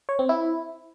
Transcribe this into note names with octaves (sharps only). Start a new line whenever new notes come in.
C#5
C4
E4